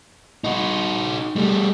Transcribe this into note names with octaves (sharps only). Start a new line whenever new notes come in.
D#4 F#4
G3 A3